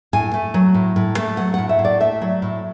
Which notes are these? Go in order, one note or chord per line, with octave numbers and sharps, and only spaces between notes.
A2 G#5
A3
F#3
A2
A2
A3
F#3 F#5
A2 F#5
E5
A2
D5
A3 E5
F#3
A2